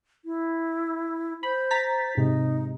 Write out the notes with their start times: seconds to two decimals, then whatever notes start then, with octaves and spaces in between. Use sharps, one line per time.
0.25 E4
1.43 C5 B5
1.71 A#5 A6 B6
2.17 G#2 C3 D#4